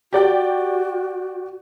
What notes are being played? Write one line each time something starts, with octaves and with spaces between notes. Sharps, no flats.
F#4 G4 D5 G5